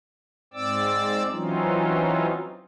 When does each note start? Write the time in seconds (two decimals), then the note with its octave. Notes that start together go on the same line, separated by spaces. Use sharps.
0.54 G#2 C4 D5 D6 E6
1.31 E3 F#3 C4 C#4 D#4 F4